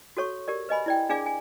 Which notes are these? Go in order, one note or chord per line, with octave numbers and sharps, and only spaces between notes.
F#4 A4 C#5 C#6
G4 A#4 D5
B4 D#5 G#5 B5
E4 D5 G5
D4 G#4 D5 F5 G#5 D6
G#5